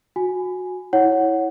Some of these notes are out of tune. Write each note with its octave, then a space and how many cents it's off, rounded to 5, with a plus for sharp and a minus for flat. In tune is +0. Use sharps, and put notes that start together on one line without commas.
F#4 -20 G#5 +0
E4 -15 C#5 +0 F#5 +0